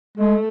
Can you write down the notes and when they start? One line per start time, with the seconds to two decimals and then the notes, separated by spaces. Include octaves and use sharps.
0.17 G#3 A3